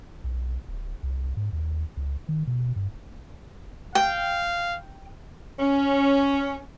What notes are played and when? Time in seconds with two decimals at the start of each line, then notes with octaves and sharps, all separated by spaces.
0.24 B1
0.68 D1
1.03 C2
1.37 G#2
1.53 D#2
1.97 C#2
2.29 D#3
2.47 B2
2.76 G2
3.95 F5 G5
5.60 C#4